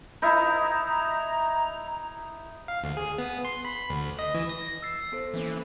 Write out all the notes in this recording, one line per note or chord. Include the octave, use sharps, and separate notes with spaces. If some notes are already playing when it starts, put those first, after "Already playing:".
D#4 E4 A#5
F5
D2
G#4
B3
C6
B5
D2
D#5
E3
A#6
E6 A6 C7
B3 A4 C5
E3 A#3 B3 C#4